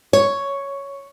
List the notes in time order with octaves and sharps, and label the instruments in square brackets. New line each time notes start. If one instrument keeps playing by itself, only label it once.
[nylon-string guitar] C#5